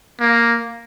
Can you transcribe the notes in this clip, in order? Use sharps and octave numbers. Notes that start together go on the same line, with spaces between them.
A#3